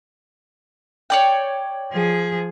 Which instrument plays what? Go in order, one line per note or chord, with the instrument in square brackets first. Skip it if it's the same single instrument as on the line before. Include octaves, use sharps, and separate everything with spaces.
[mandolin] C#5 D5 G5
[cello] F3 G#4